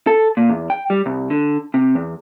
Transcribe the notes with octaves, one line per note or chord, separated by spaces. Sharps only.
A4
A#2
E2
G5
G3
C2
D3
C3
E2